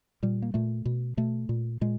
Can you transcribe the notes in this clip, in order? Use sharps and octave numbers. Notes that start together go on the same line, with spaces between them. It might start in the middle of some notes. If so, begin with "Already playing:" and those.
A#2 G3
A#3
A#2 A3
B2
B2 A3
A#2
A#2 G#3